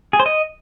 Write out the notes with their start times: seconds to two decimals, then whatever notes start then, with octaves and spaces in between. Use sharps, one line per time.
0.13 G#4
0.20 C5
0.26 D#5